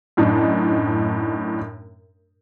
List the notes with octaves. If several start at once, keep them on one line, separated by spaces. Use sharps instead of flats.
F#2 A2 D4 D#4